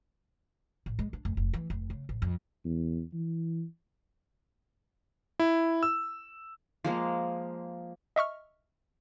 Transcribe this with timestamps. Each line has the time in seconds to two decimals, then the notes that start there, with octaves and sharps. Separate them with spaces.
0.86 A1
0.99 G#3
1.13 D4
1.25 F1
1.37 F1
1.53 E3
1.70 F1
1.90 C#3
2.09 A1
2.22 F2
2.64 E2
3.13 E3
5.39 E4
5.83 E6
6.84 F3 G#3 A#3
8.16 D#5 E5 C#6 F6